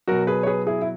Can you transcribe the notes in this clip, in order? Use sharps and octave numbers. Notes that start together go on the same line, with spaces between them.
B2 F#3 F#4 A#4
G#4 B4
C#5
G#4 B4
E4 G#4
E4